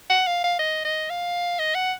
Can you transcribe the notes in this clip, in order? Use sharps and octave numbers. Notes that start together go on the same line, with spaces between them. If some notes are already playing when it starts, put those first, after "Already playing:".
F#5
F5
F5
D#5
D#5
F5
D#5
F#5